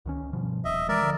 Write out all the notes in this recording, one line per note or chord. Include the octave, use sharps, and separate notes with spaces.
C#2 D#3 C#4
G2 B2 F3
D#1 D#5 E5
E3 G#3 A#4 D5 E5
D3 F3